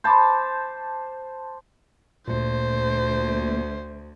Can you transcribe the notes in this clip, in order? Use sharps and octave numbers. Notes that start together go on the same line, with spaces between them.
C5 A5 B5 D6
D2 A#2 C5